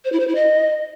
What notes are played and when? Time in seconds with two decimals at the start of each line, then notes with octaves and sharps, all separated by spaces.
0.05 C5
0.12 E4
0.20 C5
0.28 E4
0.35 D#5